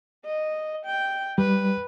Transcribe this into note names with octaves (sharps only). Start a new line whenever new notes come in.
D#5
G5
G3 B4